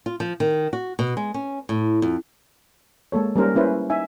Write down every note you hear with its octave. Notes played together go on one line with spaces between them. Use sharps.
F4
F3
D#3
F#4
B2
G#3
C#4
A2
F2
G#3 A#3 A4 C#5
G3 A#3 C#4 D#4 A#4 C5
A#3 C#4 E4 B4 C5 G#5
D#4 E5 G#5